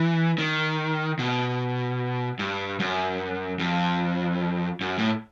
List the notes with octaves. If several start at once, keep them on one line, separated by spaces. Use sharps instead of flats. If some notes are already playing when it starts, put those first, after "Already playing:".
Already playing: E3
D#3
B2
G2
F#2
F2
F#2
A2